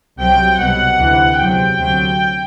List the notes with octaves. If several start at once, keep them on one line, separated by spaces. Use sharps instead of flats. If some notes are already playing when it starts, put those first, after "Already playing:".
C2 C3 F#3 G5
C2 B2 F#3 F#5
D2 C3 E3
E2 C3 F#3 G5
D2 C3 F#3